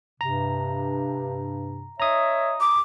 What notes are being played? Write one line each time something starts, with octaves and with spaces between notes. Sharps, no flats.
G2 C3 A#5
C#5 D#5 E5 A#5 D#6
D6